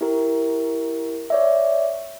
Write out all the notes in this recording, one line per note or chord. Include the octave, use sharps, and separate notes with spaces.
E4 G4 A#4
C#5 D5 E5